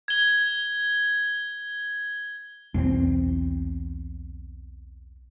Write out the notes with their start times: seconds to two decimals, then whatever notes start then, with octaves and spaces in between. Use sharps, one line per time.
0.08 G#6 G7
2.74 B1 E2 D#3 C4